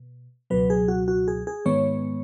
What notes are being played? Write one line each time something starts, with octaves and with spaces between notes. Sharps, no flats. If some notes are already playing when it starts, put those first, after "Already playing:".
Already playing: B2
C#2 B2 F#3 B4
G#4
F#4
F#4
G#4
G#4
G#2 D#3 G#3 B3 C#5